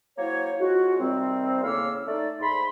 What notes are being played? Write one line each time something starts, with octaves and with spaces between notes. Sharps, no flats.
F#3 A#3 E4 C5 C#5
G#3 C#4 F4 F#4
C3 D#3 G3 C4
A2 C#3 A#3 C#5 F5 E6
A3 D#4 D5
G#2 B5 C6